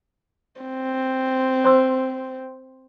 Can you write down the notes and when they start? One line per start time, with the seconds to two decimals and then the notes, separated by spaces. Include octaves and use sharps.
0.61 C4
1.64 C5 C6 E6